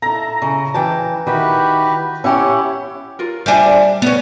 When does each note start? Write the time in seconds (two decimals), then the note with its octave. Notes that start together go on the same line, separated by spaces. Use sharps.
0.02 E4 A4 A#5
0.42 C#3
0.74 E3 G5 A5
1.27 D#3 E4 F#4 G4 B4
2.24 C#4 E4 G4 C#5 F#5
3.19 F4 A#4
3.46 G3 D4 C5 E5 G#5
4.02 B3 C#4